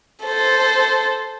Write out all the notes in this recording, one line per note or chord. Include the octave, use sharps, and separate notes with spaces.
A4 C5